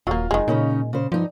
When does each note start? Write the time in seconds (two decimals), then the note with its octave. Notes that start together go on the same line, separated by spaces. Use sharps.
0.07 D#1 F#3 A#3 F4
0.31 F1 D#3 G#3
0.48 A#2 C#3 C#4 D#4
0.93 C#3 C5
1.12 G2 F3 D#4